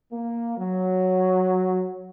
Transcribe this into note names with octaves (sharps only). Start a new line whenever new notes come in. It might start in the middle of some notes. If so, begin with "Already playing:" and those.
A#3
F#3